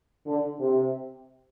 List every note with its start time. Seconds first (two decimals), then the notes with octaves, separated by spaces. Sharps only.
0.25 D3
0.59 C3